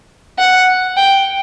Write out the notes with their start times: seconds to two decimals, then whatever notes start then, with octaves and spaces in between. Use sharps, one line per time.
0.39 F#5
0.97 G5